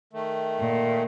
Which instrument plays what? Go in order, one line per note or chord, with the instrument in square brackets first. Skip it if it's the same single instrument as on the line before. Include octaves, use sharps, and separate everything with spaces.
[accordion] D#3 A3
[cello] A#2